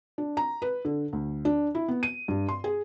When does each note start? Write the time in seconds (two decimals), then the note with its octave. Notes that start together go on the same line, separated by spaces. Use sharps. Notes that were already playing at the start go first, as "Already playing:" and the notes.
0.18 D4
0.37 A#5
0.62 B4
0.85 D3
1.13 D2
1.45 D4
1.75 E4
1.88 B3
2.03 D#7
2.28 G2
2.49 C6
2.64 G#4